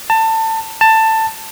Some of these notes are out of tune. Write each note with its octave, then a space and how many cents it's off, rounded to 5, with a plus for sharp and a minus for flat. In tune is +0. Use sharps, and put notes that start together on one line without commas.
A5 +25
A5 +15